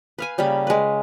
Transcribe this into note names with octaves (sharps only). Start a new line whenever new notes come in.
B4 F5 G#5
C#3 G3 A#3 B5
G#3 B4